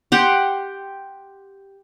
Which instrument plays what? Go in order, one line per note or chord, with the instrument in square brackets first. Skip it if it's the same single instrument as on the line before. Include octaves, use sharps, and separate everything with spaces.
[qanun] G4 F#5 C6